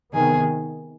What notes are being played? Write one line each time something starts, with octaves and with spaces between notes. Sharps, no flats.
C3 D#3 B3 G#4